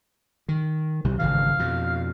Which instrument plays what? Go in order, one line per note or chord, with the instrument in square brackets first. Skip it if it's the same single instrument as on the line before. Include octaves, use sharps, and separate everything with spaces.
[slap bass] D#3
B1 C3 G3
[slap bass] G#1 C#3 E3 [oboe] F5
[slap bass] F2 B2